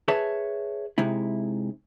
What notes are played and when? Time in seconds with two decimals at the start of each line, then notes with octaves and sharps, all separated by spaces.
0.08 G#4 B4 C#5 E5 A5
0.98 C3 G#3 D#4 E4